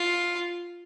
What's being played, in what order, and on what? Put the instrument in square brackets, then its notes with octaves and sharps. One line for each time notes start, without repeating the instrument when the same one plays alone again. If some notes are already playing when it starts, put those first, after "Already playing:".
Already playing: [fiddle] F4